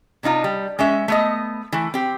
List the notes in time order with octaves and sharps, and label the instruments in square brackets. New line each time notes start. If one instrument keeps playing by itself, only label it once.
[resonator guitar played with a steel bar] C3 D4 D#4 F4
G3
G#3 C#4 E5
A3 B3 D#5
E3 A3
C4 G4